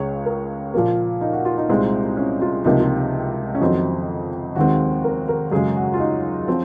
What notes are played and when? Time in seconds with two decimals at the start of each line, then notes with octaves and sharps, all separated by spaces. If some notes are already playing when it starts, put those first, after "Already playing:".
Already playing: C#2 C#3 G#3 C#5
0.25 A#4
0.74 A#2 F3 A#3
1.21 D#4
1.33 F#4
1.45 F4
1.58 D#4
1.69 C2 A#2 G#3 C4
2.17 C#4
2.41 F4
2.64 C#2 C3 F3 A#3 D#4
2.80 F4
3.55 C#4
3.61 F2 D#3 F#3 C4 D#4
4.56 D#2 D#3 G#3 C4 F#4
5.04 A#4
5.28 A#4
5.51 F#2 C#3 G#3 G#4
5.76 F#4
5.94 F4
5.99 D#4
6.48 F3 C4